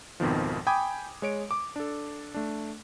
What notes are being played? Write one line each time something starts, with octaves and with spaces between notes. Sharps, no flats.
G#1 F2 B2 D#3 F3
G5 G#5 B5 D6 D#6 G#6
G#3 C#5 D7
D6
D4 A4
A3 D4